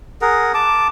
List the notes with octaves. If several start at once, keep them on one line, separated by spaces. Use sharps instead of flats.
G#4 A#4 F#5
A5 D6